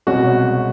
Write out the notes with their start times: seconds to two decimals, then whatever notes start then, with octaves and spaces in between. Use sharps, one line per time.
0.07 C2 B2 G#3 C#4 F#4